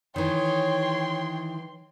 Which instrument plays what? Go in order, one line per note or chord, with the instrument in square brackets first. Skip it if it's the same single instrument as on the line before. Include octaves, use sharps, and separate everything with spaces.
[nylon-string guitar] D#3 E3 [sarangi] C#5 [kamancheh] G5 C6